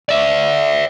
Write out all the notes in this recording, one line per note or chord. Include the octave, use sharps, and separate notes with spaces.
D5 E5